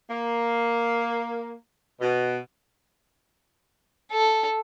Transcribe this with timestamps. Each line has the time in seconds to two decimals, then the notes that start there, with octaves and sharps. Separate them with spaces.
0.10 A#3
2.01 B2
4.12 A4